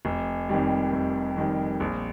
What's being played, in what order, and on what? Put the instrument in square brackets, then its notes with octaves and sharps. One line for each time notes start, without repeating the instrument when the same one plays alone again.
[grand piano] F1
F2 D#3 G3
F1
F2 D#3 G3
A#1